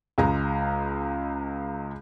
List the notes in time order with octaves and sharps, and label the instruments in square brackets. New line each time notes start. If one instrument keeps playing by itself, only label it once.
[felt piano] C#2 G#3 A#5